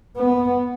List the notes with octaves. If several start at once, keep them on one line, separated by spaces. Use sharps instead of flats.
B3